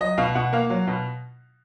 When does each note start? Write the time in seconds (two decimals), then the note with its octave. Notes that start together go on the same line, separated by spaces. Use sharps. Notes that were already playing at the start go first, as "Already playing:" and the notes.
0.01 F#3 D#5
0.18 B2 F5
0.35 B2 F#5
0.53 A#3 F5
0.70 F#3
0.87 B2